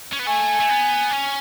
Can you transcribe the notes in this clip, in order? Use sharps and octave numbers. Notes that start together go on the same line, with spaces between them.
C#4
B3
A3 G#5
A3
B3
C#4